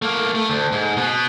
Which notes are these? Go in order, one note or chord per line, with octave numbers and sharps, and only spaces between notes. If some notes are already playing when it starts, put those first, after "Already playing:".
A3 A#3
A3
D2
G#2
B2 B3